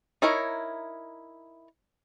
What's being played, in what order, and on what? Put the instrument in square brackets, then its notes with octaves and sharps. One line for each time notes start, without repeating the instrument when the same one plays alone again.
[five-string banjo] D#4 E4 A#4 C#5